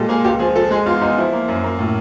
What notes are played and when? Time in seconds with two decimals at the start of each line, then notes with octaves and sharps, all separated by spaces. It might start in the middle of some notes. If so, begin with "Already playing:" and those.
Already playing: A#2 G3 G#3 A4
0.09 A#3 G#4
0.24 C#2 G4
0.40 F3 G#4
0.56 F3 A4
0.71 G#3 G#4
0.86 E2 F4
1.01 E2 D#4
1.17 F3 E4
1.33 A#3
1.48 F#2
1.64 A#3
1.79 A2